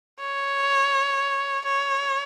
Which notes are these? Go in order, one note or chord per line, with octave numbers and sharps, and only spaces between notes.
C#5
C#5